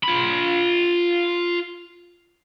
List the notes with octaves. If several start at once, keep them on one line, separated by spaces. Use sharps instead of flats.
F4 B5